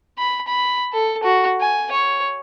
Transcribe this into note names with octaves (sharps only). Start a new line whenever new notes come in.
B5
B5
A4
F#4
G#5
C#5